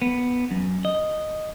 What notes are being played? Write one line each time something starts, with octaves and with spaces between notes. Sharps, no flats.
B3
F#2
D#5